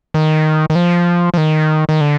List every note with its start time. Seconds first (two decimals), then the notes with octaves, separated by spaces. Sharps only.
0.14 D#3
0.70 D#3
0.75 F3
1.34 F3
1.37 D#3
1.89 D#3
2.01 D3